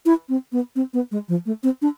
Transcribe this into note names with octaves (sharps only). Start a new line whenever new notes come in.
E4
C4
B3
C4
B3
G#3
F3
A3
C4
D4